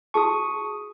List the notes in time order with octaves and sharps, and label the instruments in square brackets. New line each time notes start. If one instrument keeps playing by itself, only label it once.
[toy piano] F#4 G#4 A5 [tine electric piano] C#6 D#6